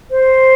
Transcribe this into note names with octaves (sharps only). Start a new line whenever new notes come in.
C5